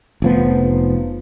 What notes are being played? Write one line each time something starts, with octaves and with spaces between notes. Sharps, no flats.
F1 F3 B3